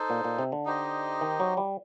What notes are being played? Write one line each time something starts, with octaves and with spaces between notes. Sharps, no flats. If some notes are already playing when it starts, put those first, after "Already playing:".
Already playing: D#4 A4 C5
A#2
A#2
C3
D3
D#4 G4 C5 D#5
D#3
F#3
G3